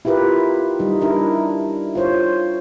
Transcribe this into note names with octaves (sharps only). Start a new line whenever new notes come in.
E4 F4 G4 A#4 B4
G3 D#4
D4 E4 A#4
F4 C5 C#5